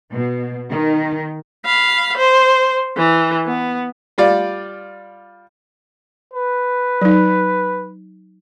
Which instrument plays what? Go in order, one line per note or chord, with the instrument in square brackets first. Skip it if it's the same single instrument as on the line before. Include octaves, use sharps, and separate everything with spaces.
[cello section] B2
D#3
[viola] F5 B5
C5
E3
B3
[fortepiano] G3 F4 D5
[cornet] B4
[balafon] F#3 D#4